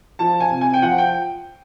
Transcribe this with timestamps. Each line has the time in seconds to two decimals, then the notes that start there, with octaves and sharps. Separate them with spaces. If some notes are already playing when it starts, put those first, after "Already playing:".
0.19 F3 A5
0.40 G#5
0.51 C3
0.61 G#5
0.73 G5
0.82 F3 F#5
0.98 G5